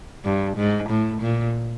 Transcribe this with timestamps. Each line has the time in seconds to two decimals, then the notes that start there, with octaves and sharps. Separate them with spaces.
0.24 G2
0.57 G#2
0.89 A2
1.21 A#2